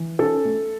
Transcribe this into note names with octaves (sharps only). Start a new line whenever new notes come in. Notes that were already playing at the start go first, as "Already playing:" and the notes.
Already playing: E3
C#4 A4
A3